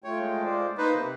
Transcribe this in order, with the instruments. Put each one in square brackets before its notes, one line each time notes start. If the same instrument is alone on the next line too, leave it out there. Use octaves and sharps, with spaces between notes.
[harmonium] A3 F4 G5 [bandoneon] C#5
[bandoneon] G#3
[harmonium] F4 C5 D5
[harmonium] A#3 [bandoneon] D#4 B4 C5
[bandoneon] C3